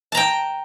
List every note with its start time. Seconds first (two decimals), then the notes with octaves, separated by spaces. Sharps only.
0.12 A5
0.15 A#5
0.17 G5